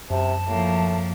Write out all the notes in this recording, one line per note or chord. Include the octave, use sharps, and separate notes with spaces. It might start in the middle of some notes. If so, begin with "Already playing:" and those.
F#2 C3 A5
A2 F3 A#3